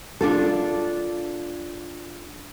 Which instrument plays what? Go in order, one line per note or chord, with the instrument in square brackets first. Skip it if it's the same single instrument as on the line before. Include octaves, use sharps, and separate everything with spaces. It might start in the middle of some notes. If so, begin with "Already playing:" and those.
[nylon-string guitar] D4 F4 A4